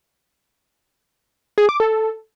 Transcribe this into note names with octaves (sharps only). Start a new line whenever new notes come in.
G#4
D6
A4